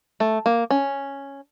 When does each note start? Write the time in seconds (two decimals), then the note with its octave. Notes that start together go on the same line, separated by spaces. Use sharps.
0.20 A3
0.46 A#3
0.70 C#4